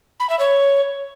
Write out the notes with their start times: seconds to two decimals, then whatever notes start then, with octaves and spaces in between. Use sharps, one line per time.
0.20 B5
0.30 E5
0.39 C#5